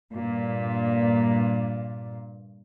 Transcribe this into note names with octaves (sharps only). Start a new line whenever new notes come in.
G2 A#2